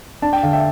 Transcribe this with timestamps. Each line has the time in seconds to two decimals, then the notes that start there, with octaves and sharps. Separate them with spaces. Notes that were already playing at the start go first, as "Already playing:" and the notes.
0.22 D4 A5
0.33 G5
0.43 D3 F5
0.53 E5 G5